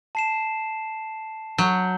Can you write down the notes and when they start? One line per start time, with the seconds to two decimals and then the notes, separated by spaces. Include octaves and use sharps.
0.15 A5 C7 E7
1.58 F#3 G6